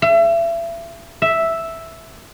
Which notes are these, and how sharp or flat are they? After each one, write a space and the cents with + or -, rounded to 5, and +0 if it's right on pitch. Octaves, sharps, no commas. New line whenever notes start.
E5 +35
E5 +0